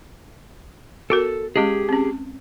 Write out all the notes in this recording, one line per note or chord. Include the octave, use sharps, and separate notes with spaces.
B3 F#4 A4 A#4
G#3 C#4 G4 G#4 D#5
C4 C#4